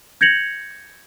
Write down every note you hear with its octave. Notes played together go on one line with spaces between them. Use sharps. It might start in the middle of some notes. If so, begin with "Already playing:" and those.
G6 G#6 A#6 C#7 F7 F#7